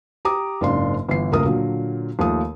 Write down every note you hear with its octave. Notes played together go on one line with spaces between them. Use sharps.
G4 A#5 D6 D#6
F#1 G#2 C#3 D4 F5 C6
G1 E3 C7
D#1 C#2 A3 A#4 D#6
A#2 D3 F#3
D#2 F3 A3 D#6